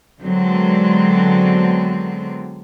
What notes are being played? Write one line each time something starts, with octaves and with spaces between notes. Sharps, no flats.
D3 F#3 G#3 B3 C4